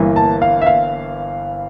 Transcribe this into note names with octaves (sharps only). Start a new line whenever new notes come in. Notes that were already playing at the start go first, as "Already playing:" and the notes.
Already playing: G1 G2 E3 A#3
A5
F5
E5
F5